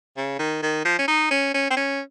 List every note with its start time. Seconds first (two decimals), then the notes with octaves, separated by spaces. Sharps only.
0.17 C#3
0.39 D#3
0.62 D#3
0.85 F3
0.99 C#4
1.08 D#4
1.31 C#4
1.54 C#4
1.70 C4
1.77 C#4